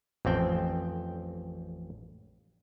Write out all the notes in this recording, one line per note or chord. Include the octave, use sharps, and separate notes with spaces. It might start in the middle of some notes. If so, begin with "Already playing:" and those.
A1 F2 C4 G5